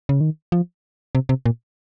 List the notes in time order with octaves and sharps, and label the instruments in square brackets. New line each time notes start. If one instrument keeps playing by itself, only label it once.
[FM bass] C#3
D#3
F3
C3
C3
A#2